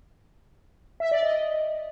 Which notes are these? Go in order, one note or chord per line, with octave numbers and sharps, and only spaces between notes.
E5
D5
D#5